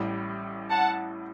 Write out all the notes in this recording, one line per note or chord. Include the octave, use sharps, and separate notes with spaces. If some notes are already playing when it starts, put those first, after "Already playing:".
Already playing: A1 A2 G3
F#5 A5